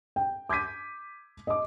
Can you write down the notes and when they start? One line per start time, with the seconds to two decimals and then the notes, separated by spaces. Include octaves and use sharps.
0.16 G5
0.49 D6 G6 G#6 B6 D#7
1.47 D#5 D6